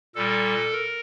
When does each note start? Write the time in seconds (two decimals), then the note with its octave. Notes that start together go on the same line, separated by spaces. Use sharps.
0.15 A#2 G3 A4
0.72 A#4